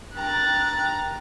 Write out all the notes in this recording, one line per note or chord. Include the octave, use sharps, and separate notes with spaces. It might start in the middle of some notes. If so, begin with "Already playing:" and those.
G2 A#4 G5 A#5 F#6 A6